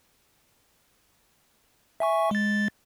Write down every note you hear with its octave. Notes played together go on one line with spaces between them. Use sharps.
E5 G#5 C#6
G#3 A6